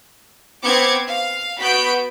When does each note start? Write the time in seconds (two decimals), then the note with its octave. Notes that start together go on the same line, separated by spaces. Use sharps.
0.64 B3 C4 D6 G#6 C#7
1.08 F5
1.59 B3 F#4 B5 G6 D7